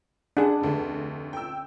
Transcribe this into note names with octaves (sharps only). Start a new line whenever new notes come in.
D4 G#4 F#5
F1 D2
G5 E6